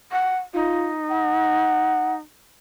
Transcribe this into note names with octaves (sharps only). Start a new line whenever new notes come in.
F#5
D#4 F4
F#5